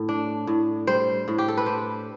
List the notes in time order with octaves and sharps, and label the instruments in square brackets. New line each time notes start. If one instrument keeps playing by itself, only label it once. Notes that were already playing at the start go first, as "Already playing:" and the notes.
Already playing: [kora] A2
D4
A2
G3 C5
A2
G4
A4
B4
D4 C5